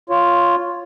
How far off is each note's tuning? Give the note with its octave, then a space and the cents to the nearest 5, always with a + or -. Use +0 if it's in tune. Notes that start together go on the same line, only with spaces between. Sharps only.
F4 +0 C#5 +0